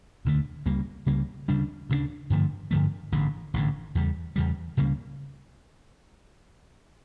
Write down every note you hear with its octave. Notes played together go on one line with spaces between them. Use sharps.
E1 D2 D3 A3
C#2 C#3 G3 A#3
C#2 C#3 G3 A#3
D2 C#3 G3 D4
D2 C#3 G3 D4
G2 D3 F3 A3
G2 D3 F3 A3
A1 G2 D3
A1 G2 D3
E2 C#3 G3
E2 C#3 G3
C#2 C#3 G3 A#3